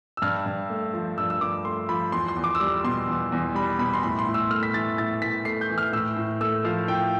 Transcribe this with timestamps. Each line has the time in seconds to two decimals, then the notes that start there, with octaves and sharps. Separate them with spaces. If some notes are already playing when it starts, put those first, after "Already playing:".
0.17 E6
0.22 G2 F6
0.46 G2
0.70 A3
0.93 F3
1.17 G2 E6
1.30 E6
1.41 G2 D6
1.65 A3 C6
1.89 F3 B5
2.12 E2 C6
2.28 C6
2.37 E2
2.44 D6
2.55 E6
2.60 G3 D6
2.84 B2 C6
3.08 E2
3.32 E2
3.55 G3 B5
3.79 B2 B5
3.93 C6
4.03 A2 B5
4.19 C6
4.27 A2
4.34 E6
4.50 A3 F6
4.63 B6
4.74 E3 A6
4.98 A2 A6
5.22 A2 B6
5.45 A3 C7
5.61 G6
5.70 E3
5.78 F6
5.93 A2 E6
6.17 A2
6.41 A3 E6
6.64 F3 F5
6.88 A2 G5